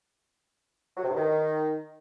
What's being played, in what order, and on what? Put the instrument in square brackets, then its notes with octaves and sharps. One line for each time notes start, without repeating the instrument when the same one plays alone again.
[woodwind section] F#3
C3
G2
D#3